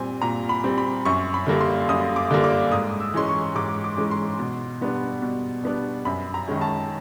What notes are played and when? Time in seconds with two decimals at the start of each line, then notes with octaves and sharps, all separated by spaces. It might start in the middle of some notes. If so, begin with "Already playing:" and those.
Already playing: A#2 G3 C4 G#5
0.22 A#2 A#5
0.49 B5
0.64 G3 C4
0.78 B5
1.05 F#2 C#6
1.34 B5
1.47 D3 G3 A#3
1.61 C6
1.89 F#2 D#6
2.16 D6
2.31 D3 G3 A#3
2.44 D6
2.72 G#2 D#6
3.00 E6
3.14 E3 G#3 C#4 C6
3.28 C#6
3.55 G#2 D6
3.84 D6
3.97 E3 G#3 C#4
4.11 C6
4.39 B2
4.81 G3 B3 D4
5.22 B2
5.64 G3 B3 D4
6.05 F#2 B5
6.34 A#5
6.48 D#3 G#3 C#4
6.61 A5